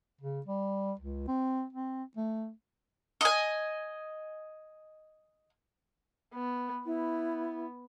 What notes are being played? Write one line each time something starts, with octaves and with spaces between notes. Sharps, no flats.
C#3
G3
C#2
C4
C4
A3
D#5 G#5
B3
B3 E4